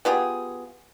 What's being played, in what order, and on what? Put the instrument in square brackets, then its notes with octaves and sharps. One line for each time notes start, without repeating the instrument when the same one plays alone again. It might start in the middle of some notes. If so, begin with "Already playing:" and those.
[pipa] B3 F4 G4 G#4